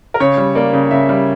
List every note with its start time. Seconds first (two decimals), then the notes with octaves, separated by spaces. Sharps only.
0.14 A#4
0.20 C#3 C#5
0.37 G3
0.55 A#3 D5
0.73 C#3
0.91 C#3 E5
1.09 G3